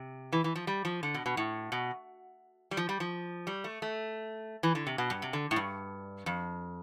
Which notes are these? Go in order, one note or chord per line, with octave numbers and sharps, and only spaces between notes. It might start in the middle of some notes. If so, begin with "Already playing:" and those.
Already playing: C3
E3
E3
F3
G3
F3
D3
B2
B2
A2
B2
G3
F3
G3
F3
G3
A3
A3
E3
D3
C3
B2
G2
C3
D3
A2
G2
F2